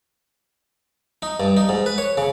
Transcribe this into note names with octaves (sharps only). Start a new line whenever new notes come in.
D#4
G2
D#4
G#2
B4
C#5
C#3